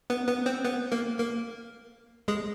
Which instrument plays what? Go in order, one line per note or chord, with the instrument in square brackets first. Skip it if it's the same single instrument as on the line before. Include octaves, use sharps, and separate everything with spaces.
[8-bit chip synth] B3 B4
B3 B4
C4 C5
B3 B4
A#3 A#4
A#3 A#4
G#3 G#4